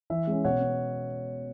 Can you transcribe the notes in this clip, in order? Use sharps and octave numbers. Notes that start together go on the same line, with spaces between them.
E3 E5
G#3 C#4
B2 C#5 F#5
B3